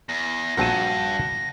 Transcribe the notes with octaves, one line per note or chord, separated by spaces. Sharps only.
E2 A#6
A#1 G2 C4 F#4 A#4 A5 D#7